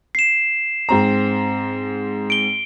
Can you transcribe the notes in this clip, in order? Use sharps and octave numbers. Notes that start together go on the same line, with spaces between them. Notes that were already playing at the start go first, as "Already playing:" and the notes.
C7 E7
G#2 C4 A#5
D7 G7